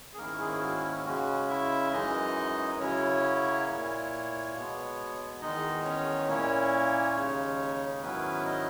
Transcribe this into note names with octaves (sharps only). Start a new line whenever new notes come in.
G#4
G#2 D#3 A#3 C#4 E4 A#4
G#3 G#4
F#4
E4
C#3 G#3 C#4 F#4
E4 E5
F#2 E3 G#3 D#4 D#5
F#2 C#3 F#3 C#4 E4 C#5
A#2 A#3 E4
B2 G#3 B3
E2 D#3 G#3 D#4 D#5
C#4 C#5
A#2 A#3 C#4 E4 C#5
D#2 C#3 G#3 D#4
G#2 D#3 F#3 B3 C#4 E4 B4
D#4 D#5